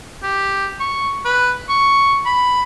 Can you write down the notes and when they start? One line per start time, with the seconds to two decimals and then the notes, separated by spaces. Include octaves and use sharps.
0.23 G4
0.80 C#6
1.25 B4
1.69 C#6
2.26 B5